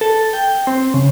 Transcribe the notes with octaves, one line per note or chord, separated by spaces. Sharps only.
A4
G5
C4
C#3